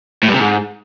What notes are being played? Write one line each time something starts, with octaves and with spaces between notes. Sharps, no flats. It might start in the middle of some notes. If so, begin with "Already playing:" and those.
A2
G2
C3
G#2